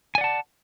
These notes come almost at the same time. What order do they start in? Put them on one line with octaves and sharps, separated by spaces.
G#5 D5 F#5 A5